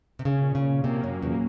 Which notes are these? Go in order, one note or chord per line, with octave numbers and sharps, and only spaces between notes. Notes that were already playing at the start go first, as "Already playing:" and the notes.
C3
C#3 C#4
A#2
C#3 C#4
A#2
C3 A#3
F#3
F#2
A#2
E2
A#3